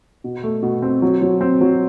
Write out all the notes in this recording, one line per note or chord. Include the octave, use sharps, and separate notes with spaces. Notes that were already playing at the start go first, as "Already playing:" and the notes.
B2
A3
B2
C4
F#3
F#3
C4
F#3